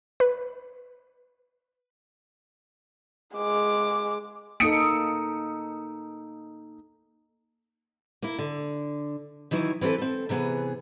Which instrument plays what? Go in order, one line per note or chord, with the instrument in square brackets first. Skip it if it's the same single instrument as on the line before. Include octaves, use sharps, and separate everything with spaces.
[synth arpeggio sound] B4
[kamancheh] G#3 D6
[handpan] A#3 D#4 A4 [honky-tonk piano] D#6 C#7 D7
[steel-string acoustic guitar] A#3 E4
D3
D#3 E3 F#3 E4
E3 C4 F4 A4 B4
C4 A4
C3 E3 B3 G#4